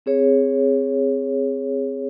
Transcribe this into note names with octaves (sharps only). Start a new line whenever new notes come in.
C4 G#4 C#5